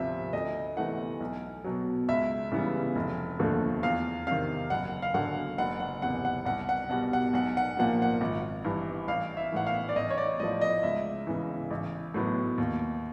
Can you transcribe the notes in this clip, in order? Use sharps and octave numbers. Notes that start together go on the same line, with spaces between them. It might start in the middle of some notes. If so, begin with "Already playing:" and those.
Already playing: D2 C3 F3 E5
D2 D#5
C3 E3 A3 F#5
B1
B2 F#3
C#2 E5
C#3 E3 G3 B3
F1
D#2 D3 F3 A3
E2 F5
C3 D#3 F5
F#1 F#5
F5
F#2 D3 F#3 F#5
F#1 F#5
F#5
E2 C3 F#5
F#5
C2 F#5
F#5
B2 G3 F#5
F#5
B1 F#5
F#5
A#2 F3 A#3 F#5
F#5
G#1
G2 E3
A1 F5
E5
A2 E3 F#5
F5
D5
A1 D#5
C#5
D5
A2 F3 D#5
D#5
C#2 E5
C#3 E3
A1
A2 F#3 B3
D#2